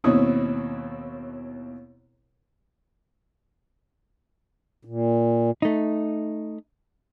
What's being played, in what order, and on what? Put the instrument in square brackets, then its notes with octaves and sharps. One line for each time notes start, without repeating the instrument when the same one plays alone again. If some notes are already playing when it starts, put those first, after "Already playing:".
[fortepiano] D#2 B2 C4 E4 C#5 D#6
[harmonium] A#2
[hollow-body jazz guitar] A3 D#4